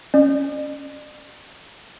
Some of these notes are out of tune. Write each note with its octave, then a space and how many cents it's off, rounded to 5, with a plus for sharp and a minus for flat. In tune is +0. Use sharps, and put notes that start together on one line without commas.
C#4 +0 D5 +40